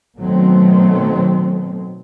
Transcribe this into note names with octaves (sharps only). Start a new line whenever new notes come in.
B2 D#3 F#3 A3 C4